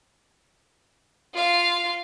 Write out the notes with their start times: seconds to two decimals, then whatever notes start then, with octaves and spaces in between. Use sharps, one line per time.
1.34 F4 F5